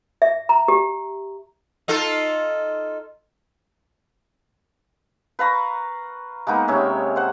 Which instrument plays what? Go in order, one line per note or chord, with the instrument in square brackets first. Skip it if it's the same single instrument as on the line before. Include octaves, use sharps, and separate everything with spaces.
[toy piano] E5
A#5
G4
[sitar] D#4 F4 A4
[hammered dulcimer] B4 F5 A#5 C#6
G#3 A#3 B3 D#4
C3 C#4 C#5 E5
C5 F#5